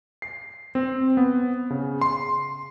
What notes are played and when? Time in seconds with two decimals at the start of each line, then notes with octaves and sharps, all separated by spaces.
0.22 C7
0.75 C4
1.17 B3
1.70 C#3
2.01 C6